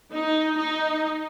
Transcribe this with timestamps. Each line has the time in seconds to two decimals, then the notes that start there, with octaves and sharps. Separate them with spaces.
0.11 D#4
0.56 D#4